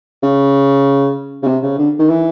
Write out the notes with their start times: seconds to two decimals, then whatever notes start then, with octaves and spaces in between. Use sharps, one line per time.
0.23 C#3
1.43 C#3
1.47 C3
1.63 C#3
1.78 D3
1.99 D#3
2.09 E3